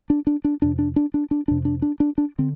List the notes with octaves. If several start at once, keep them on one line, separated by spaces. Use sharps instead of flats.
D4
D4
D4
F2 C3 D4
D4
D4
D4
D4
F2 C3 D4
D4
D4
D4
D4
D3 C4